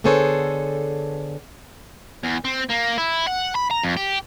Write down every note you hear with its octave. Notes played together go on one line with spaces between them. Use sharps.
D3 B3 G#4 A4 C5 C#5
E2
C4
A#3
E4
F#5
B5
A#5
F2
G4